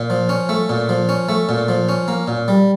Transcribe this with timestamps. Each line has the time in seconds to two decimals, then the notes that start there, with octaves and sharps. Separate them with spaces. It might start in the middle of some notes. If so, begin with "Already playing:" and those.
Already playing: A#2
0.10 F3
0.29 C#4
0.49 A3
0.69 A#2
0.89 F3
1.09 C#4
1.29 A3
1.49 A#2
1.69 F3
1.89 C#4
2.08 A#3
2.28 A#2
2.48 G3